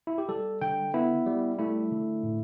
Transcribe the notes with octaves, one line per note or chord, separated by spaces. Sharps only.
E4
G4
G3 A4
D3 G5
B3 E4
G3
A3 E4
D3
A2